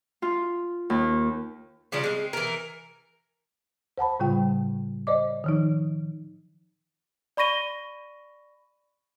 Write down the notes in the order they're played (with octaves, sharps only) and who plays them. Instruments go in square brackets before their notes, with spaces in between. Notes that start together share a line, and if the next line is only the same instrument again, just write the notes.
[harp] F4
D#2
[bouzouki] C#3 F3 G3 D4
G#3 C4
E3 A#4
[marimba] C5 F#5 A5 B5
A2 C#3 G3 F4 G5
C5 D5 D#5 D6
D#3 F3 D#4
[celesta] D5 B5 C#6 A#6 D#7 G7